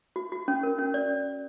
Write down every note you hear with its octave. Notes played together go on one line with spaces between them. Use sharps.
F#4
F#4
C#4
A#4
C#4
D5